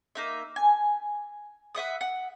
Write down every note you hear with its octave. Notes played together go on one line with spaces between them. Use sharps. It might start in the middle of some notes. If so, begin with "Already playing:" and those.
A#3 D#4 E5
G#5
B4 E5 F#5 D#6
F#5